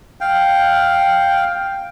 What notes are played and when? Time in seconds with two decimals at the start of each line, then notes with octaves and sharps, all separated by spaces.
0.21 F5 G5